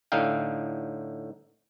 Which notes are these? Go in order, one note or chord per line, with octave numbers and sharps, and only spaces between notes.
A2 D3 D#4 F5 G5